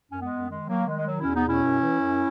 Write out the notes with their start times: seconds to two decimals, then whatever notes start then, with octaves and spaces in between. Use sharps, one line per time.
0.11 F#2 C#4
0.21 G#3 B3
0.31 F#2
0.49 D#3 G#3
0.68 D#3 F#3 A#3
0.87 D#3 G#3
0.97 G#3
1.06 B2 F#3
1.20 E2 C#4 E4
1.34 B3 D#4
1.44 B2 C#4 E4
1.62 F#2
1.82 E3
2.01 F#2